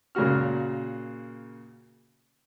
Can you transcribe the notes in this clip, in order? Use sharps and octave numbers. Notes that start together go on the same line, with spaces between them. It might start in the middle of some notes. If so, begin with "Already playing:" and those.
A#2 C#3 A#3 F#4 F6